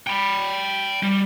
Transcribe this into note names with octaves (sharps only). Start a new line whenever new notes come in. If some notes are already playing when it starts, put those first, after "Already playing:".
G5 B5
G3